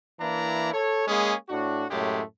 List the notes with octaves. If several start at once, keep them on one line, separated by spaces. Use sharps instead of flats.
E3 A#3 D4 E4 A#5
A4 C#5
G#3 A#3 C#4 G#4
A2 D4 F#4
F#2 A2 G#3 A3 G4